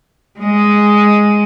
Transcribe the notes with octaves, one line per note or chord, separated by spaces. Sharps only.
G#3 D#5